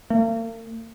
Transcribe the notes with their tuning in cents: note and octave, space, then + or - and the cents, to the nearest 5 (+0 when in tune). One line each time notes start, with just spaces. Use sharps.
A#3 -45